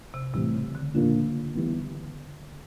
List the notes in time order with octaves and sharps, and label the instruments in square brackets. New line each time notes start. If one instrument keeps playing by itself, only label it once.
[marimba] C3
[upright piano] A2 E3 G3 C4 [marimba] C3
[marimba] C#3
D3
[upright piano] A#2 F3 A#3 D4 [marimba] D3
[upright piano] E3 G3 B3